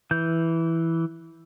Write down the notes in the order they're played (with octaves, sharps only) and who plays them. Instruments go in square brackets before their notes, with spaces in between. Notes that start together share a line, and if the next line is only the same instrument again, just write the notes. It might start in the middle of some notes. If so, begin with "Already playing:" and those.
[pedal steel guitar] E3 G6